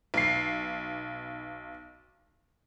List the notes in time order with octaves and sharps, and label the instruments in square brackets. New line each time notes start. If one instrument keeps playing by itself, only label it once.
[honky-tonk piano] B1 C7